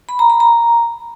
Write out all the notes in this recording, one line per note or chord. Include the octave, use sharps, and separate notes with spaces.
B5
A#5
B5
A#5